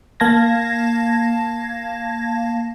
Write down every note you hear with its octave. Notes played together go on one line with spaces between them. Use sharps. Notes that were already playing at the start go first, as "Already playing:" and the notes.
A#3 F5 A5 G#6 A#6